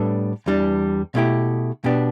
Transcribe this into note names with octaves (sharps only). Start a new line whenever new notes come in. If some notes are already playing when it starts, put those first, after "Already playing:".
Already playing: A2 G3 B3 D4 A4
E2 E3 G3 D4
B2 A3 E4 G4
B2 B3 D4 G4